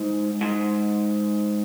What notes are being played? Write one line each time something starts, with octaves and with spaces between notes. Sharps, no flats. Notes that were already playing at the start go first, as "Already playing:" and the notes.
Already playing: G#2
G#2